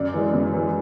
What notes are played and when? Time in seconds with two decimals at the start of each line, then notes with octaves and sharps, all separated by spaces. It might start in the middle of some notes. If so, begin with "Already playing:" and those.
Already playing: F#2 D5
0.14 E3 G#3
0.34 F#2
0.54 E3 G#3